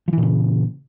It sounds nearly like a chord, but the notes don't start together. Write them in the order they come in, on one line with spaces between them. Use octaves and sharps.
F3 E3 A#2 C#3